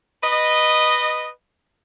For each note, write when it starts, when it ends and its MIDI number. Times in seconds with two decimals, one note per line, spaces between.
0.23 1.27 71
0.23 1.27 75